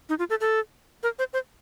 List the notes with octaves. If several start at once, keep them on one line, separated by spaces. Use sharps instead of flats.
D#4
F4
A4
A4
A#4
C5
C5